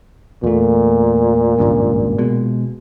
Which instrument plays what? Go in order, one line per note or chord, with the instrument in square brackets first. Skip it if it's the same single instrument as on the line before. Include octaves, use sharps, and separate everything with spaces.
[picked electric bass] E2 A3 [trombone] A#2
[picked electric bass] G#1 C#2 G2
B2 G#3